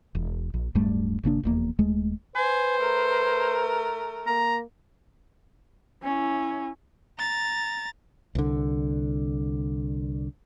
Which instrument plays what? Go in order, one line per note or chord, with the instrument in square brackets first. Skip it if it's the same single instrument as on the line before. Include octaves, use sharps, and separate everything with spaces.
[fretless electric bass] E1
A#1
D1 G2 G3 A3
G#1 C#3 A#3 D4
F1 E2 A#3
D#1 D#2 G#3 A3
[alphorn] B4 [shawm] C5 [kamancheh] G#5
[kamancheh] A3 A#4
[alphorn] A#3 [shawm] A#5
[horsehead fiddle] C#4 E4
[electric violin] A#5 A6
[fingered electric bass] C2 D3